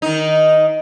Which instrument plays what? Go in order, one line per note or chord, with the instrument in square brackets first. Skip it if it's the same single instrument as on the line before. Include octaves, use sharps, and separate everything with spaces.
[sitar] D#3 D#4